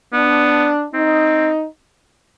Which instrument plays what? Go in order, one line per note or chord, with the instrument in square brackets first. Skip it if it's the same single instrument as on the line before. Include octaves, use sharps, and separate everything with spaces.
[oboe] B3 [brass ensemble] D4
[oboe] C4 [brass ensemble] D#4